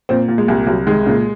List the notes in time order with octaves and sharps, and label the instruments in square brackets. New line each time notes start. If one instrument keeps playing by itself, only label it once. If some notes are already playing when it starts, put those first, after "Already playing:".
[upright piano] A#2 [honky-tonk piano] C4
[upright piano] A#2
[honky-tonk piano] G#3
[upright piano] C2
[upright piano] C2 [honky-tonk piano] F#3
[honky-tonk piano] D#3 [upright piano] G#3
[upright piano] A#2 [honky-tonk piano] C#3